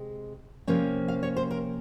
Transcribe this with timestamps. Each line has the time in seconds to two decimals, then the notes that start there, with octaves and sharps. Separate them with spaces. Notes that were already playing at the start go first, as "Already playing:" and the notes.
Already playing: C3 G#3
0.67 C3 F3 A#3 C#4
1.08 F5
1.23 C#5
1.37 C5
1.51 A#4